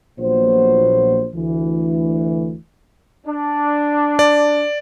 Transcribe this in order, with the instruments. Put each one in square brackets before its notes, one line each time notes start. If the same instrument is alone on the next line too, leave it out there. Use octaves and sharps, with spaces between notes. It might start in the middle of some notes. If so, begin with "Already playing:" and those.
[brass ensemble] A#1 A#2 F#3 B3 C5
D2 E3
[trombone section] D4
[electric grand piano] D5